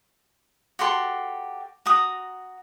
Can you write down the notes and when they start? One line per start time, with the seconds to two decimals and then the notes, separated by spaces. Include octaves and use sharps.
0.79 F#4 G4 A4 C6
1.86 F#4 A#5 D#6